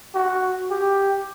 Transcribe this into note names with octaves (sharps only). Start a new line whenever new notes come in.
F#4
G4